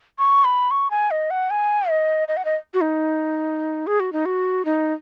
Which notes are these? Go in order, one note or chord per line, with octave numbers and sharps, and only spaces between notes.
C#6
B5
C#6
G#5
D#5
F#5
G#5
D#5
D#5
F#5
D#5
F#4
D#4
G#4
F#4
D#4
F#4
D#4